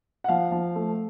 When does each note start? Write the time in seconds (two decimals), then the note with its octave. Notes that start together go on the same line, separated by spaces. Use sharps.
0.24 F#5
0.28 F3 F5
0.52 F3
0.75 A3